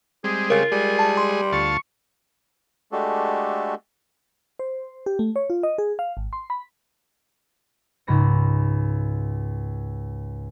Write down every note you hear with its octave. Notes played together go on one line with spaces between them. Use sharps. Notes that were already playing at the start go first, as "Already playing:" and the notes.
G3 G#3 C4 G#4
C#3 F4 A#4
G3 G#3 G#4
A5
C6
D2 F4 A5 C#6
G#3 A3 D4 F#4 G4 A4
C5
G4
A3
C#5
F4
D#5
G#4
F5
G#1
C6
B5
C#2 G#2 B5 A#6 C#7